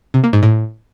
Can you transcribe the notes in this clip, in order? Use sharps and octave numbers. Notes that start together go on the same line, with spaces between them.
C3
A#3
G#2
A2